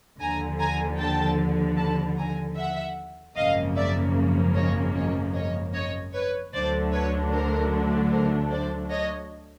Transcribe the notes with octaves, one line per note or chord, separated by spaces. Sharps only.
D#2 D3 F3 G#5 A#5
G#5 A#5
G5 A5
A5 B5
G#5 A#5
E5 F#5
G#1 F#2 C#3 F3 A#3 D#5 F5
D5 E5
C#5 D#5
C#5 D#5
C#5 D#5
C#5 D#5
B4 C#5
D2 D3 F#3 A3 D4 C5 D5
B4 C#5
A#4 C5
A#4 C5
C5 D5
C#5 D#5